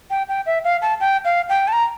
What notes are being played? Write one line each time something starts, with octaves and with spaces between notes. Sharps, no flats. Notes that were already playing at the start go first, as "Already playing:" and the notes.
G5
G5
E5
F5
A5
G5
F5
G5
A5
A#5